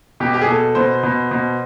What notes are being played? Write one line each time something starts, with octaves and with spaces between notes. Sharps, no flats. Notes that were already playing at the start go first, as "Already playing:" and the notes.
B2 G4
G4
G#4
B2 A4
B2 C5
B2
B2